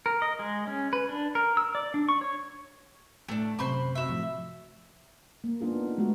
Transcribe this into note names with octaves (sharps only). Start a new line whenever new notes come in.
A#4
D#5
G#3
C#4
B4
D4
A#4
E6
D5
D4
C#6
C#5
A2 A3 D4
F#2 C3 C5 B5 C#6
F#4 E5
A2 F3
A#3
A#3 B3 D4 F4 G#4
D#4
D#4
G#3 A3 B3 F#4